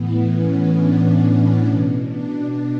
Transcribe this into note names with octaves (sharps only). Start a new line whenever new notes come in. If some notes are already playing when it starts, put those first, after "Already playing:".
Already playing: A2 E3 B3
C#4
D4
C#4
B2
D4